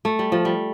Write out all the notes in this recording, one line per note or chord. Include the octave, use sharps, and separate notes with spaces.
A3
G3
F3
G3